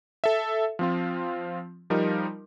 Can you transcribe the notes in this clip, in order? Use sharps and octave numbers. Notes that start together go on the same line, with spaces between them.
A4 E5
F3 C4 F4
F3 G3 D#4 A#4